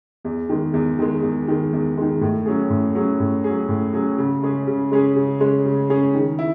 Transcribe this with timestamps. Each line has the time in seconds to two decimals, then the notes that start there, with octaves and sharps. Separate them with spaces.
0.25 E2
0.49 D#3 G#3
0.74 E2
0.99 D#3 G#3
1.23 E2
1.48 D#3 G#3
1.73 E2
1.97 D#3 G#3
2.21 A2
2.46 F#3 C#4 G#4
2.70 A2
2.95 F#3 C#4 G#4
3.20 A2
3.44 F#3 C#4 G#4
3.69 A2
3.94 F#3 C#4 G#4
4.18 C#3
4.43 G#3 C#4 G#4
4.67 C#3
4.91 G#3 C#4 G#4
5.16 C#3
5.40 G#3 C#4 G#4
5.66 C#3
5.90 G#3 C#4 G#4
6.15 D#3
6.39 E4